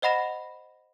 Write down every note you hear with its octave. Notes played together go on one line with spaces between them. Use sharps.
C5 D#5 F#5 B5 A#6 E7